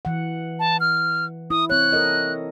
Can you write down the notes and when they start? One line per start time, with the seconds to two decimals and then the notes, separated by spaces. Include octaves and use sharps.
0.05 E3 F#5
0.59 A5
0.80 F6
1.50 E4 D#6
1.70 C4 C#5 F#6
1.92 A4 A#4 D#5